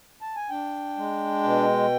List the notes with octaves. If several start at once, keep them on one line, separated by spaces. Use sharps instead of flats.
A5
G#5
D4 G5
G#3
B2